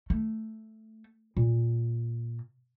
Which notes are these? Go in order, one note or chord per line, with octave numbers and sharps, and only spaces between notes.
A3
A#2